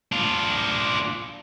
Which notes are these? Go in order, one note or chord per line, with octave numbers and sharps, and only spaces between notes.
D4 F4